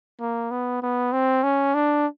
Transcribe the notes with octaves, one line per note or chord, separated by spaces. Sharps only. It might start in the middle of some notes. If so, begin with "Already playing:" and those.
A#3
B3
B3
C4
C#4
D4